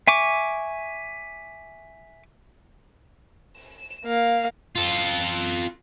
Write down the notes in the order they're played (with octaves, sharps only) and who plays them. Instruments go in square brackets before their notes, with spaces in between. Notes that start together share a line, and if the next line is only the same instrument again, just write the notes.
[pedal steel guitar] E5 G#5 C#6 D6
[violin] E7
A#3 F5
[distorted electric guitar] F4 A4